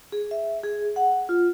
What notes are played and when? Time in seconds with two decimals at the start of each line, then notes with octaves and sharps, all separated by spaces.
0.12 G#4
0.31 E5
0.63 G#4
0.96 F#5
1.29 F4